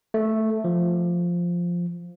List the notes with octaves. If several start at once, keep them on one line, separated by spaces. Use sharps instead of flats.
A3
F3